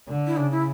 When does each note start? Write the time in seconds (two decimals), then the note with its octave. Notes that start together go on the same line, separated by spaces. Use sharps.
0.08 D3
0.27 E4
0.37 C#3 D4
0.51 E4